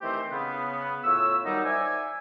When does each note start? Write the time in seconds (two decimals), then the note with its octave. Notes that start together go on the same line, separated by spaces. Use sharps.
0.01 D#3 E3 A3 C4 G4 C5
0.30 C#3 B3
1.04 A2 F4 C#5 E6
1.45 D#3 F#3 G3 D#4
1.64 C5 D5 E5 G#5